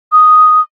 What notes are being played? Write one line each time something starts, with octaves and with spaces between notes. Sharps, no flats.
D#6